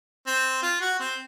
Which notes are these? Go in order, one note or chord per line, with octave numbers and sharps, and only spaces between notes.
C4
F4
F#4
C4